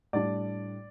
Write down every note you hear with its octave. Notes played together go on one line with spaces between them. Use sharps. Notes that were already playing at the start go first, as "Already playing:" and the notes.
A2 G3 D4 D5